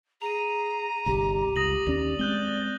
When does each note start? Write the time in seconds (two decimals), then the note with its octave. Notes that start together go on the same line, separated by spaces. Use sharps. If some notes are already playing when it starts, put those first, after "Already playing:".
0.22 G#4 A#5 D#7 F7
1.06 G1 C2 G4
1.56 C#2 D#6 A#6 F#7
1.87 D#2 C#4 D5 A#6
2.19 G#3 C4 F#6 G6 G7